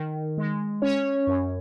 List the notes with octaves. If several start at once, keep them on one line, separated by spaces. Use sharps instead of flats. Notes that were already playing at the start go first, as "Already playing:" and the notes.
Already playing: D#3
G#3
C#4 C#5
F#2